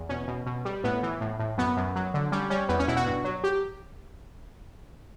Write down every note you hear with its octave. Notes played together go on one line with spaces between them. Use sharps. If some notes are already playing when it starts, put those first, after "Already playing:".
Already playing: E2
B2 C#4
B2
B2
G3
A2 B3
E3
A2
A2
F#2 B3
F#2
F#3
D3
G3 C#4
G3 C#4
E2 B3
C#4
B2 E4
F#4
G2
F#3
G4